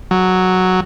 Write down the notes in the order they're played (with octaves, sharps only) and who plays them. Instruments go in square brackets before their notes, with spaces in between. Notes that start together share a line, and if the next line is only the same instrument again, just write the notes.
[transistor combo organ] F#3